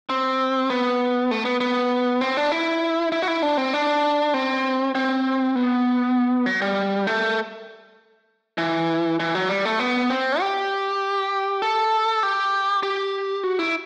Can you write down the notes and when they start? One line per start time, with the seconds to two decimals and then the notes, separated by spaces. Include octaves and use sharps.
0.09 C4
0.70 B3
1.31 A3
1.45 B3
1.60 B3
2.21 C4
2.37 D4
2.52 E4
3.12 E4
3.22 F#4
3.28 E4
3.43 D4
3.57 C4
3.74 D4
4.34 C4
4.95 C4
5.56 B3
6.46 F#3
6.62 G3
7.07 A3
8.58 E3
9.20 E3
9.35 F#3
9.49 G3
9.65 A3
9.79 B3
10.10 C4
10.40 G4
11.62 A4
12.23 G4
12.83 G4
13.43 F#4
13.59 E4